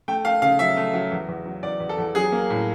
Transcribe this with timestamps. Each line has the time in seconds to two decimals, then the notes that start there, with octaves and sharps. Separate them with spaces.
0.08 A3 G5
0.25 A3 F5
0.42 C#3 F5
0.59 F#3 E5
0.77 A3
0.94 F#3
1.11 E2
1.28 E2
1.46 F#3
1.63 E2 D5
1.80 E2
1.89 A4
1.98 E2
2.15 F#3 G#4
2.32 A#3
2.50 A2